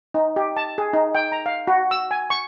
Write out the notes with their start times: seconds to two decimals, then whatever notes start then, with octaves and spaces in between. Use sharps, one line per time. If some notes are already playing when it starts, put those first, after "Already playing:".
0.14 D#4
0.36 G4
0.56 A5
0.78 G#4
0.93 D#4
1.15 G5
1.32 A#5
1.46 F5
1.67 F#4
1.91 E6
2.11 G#5
2.30 C#6